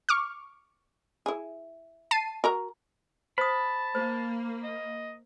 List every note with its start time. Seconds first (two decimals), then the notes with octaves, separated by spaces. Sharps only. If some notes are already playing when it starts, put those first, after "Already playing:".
0.09 C#6 D6 F6
1.26 E4 G#4
2.11 A5 C7 D#7
2.44 F#4 A#4 A#5
3.38 C5 A5 B5 D#6
3.95 A#3 C5
4.63 D#5